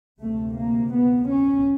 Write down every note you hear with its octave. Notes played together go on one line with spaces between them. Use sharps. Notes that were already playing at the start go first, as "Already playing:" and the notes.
D2 C3 A3
A#3
B3
C#4